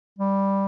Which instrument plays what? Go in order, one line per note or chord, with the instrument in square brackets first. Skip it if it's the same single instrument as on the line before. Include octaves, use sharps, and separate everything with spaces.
[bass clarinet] G3